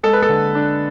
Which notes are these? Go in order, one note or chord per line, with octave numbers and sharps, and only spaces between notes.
G#3 A4
B4
A4
D3
D4